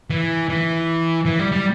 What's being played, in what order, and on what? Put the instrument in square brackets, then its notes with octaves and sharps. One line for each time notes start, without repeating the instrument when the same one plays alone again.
[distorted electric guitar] E3
E3
E3
G3
G3